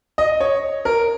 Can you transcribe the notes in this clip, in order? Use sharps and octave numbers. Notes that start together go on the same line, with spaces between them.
D#5
C#5
A#4